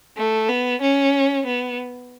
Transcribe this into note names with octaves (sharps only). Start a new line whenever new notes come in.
A3
B3
C#4
B3